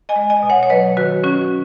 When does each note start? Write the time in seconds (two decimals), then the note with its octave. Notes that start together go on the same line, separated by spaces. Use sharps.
0.09 D#5 G#5
0.16 G#3
0.30 D#5 G#5
0.43 B2
0.50 C#5 F#5
0.63 C#5
0.70 F#3 B4 D#5
0.97 D#3 F#4 B4
1.24 D#3 C#4 F#4